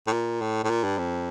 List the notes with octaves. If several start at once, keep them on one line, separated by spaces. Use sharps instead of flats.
A2
A#2
A2
A2
A#2
G2
F2